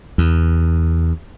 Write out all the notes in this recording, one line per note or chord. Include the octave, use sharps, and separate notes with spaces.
E2